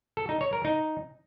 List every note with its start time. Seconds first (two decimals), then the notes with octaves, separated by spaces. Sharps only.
0.17 A4
0.29 D#4
0.41 C#5
0.53 A#4
0.65 D#4